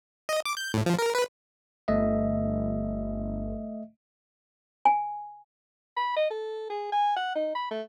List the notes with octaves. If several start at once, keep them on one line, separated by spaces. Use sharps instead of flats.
D#5
D6
G6
A2
F3
A#4
B4
G1 A3 D#5 E5
G#5
B5
D#5
A4
G#4
G#5
F#5
D#4
B5
A3